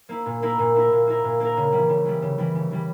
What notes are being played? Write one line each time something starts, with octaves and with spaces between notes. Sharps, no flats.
A#3 E4
A#2
A#3 E4 A#4
A#2
A#3 E4 A#4
A#2
A#3 E4 A#4
A#2
A#3 E4 A#4
C#3
E3 G3
C#3
E3 G3
C#3
E3 G3
C#3
E3 G3